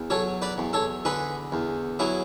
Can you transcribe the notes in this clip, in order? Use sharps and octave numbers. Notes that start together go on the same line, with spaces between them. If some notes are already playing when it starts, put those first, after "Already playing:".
Already playing: E2
F#3 A4 C#5
B4 D5
E2
A4 C#5
D3 G#4 B4
E2
F#3 E4 G#4